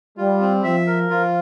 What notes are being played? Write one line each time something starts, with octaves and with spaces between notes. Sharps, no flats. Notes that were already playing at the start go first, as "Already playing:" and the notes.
G3 F4
C4
F3 E5
A#4
F3 F4